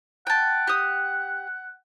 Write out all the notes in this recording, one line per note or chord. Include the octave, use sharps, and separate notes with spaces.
F#5 G5 A5
G4 D#6